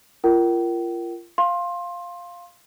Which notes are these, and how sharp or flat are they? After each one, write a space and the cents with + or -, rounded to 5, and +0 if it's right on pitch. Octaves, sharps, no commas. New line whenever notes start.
F4 -30 A#4 +0 G5 -40
F5 +0 C6 +20